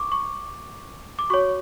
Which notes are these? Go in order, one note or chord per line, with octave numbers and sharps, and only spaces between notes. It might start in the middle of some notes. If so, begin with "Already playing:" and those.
Already playing: C#6 D6
C#6
D6
F#4 C#5 C#6